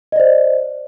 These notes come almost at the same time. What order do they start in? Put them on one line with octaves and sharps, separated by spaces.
D#5 D5 C5